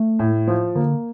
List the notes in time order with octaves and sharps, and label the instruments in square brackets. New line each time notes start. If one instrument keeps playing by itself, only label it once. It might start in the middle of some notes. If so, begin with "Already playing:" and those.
Already playing: [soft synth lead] A3
[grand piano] A2
F3
[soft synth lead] D3 [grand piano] A#3